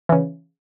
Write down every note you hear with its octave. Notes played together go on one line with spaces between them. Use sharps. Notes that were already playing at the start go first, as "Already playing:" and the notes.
C#3 E3